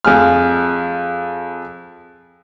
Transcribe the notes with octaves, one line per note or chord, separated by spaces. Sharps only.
F2 G#4 F6